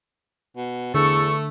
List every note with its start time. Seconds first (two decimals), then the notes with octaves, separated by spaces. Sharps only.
0.57 B2
0.94 E2 D3 A3 A4 C#6